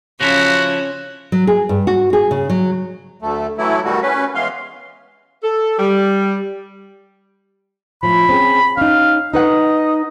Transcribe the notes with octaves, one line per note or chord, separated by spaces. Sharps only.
C#3 F3 C#4 E4 F#4
F#3
G#4
G2
F#4
G#4
C#3
F#3
D2 A3
E3 F#3 A3 E4
B2 D#3 G3 A3 F#4
C#4 B4
E3 G#3 B3 F5 C6
A4
G3
A2 F3 B5
C4 C#4 G#4
C#4 D#4 F5
D#4 B4 D#5 F#5